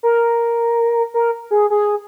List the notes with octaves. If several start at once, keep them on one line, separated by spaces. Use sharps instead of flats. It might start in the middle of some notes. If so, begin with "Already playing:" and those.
A#4
A#4
G#4
G#4